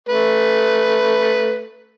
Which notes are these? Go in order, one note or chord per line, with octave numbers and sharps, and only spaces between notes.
A3 B4